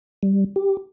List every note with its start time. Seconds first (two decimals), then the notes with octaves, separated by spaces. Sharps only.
0.23 G3
0.56 G4